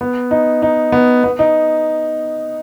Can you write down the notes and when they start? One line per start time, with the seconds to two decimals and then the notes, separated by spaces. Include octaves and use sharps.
0.01 B3
0.31 D#4
0.62 D#4
0.92 B3
1.24 B3
1.39 D#4